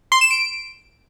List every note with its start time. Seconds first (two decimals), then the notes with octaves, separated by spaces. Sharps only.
0.12 C6
0.21 E7
0.31 D7